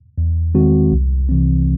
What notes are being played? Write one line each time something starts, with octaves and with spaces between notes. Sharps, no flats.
E2
D#3 G#3 C4 F#4
C2
C3 E3 C4